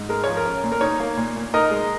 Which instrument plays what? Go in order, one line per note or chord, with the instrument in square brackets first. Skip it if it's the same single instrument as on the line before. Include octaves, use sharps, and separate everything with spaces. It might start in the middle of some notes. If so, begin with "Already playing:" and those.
Already playing: [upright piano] G#2
G#3 A#4
F3 C#5
A#4
C#4
A#2
A#4
D#4 C#5
A#3
A#2
A#2
D#4 A#4 D#5
G#3